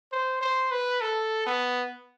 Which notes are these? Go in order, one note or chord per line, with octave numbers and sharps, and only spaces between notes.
C5
C5
B4
A4
B3